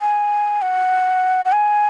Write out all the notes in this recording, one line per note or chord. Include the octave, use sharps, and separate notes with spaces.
G#5
F#5
F#5
G#5